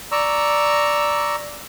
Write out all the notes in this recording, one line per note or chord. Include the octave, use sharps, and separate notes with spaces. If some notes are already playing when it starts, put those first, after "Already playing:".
D5 A#5 C#6 E6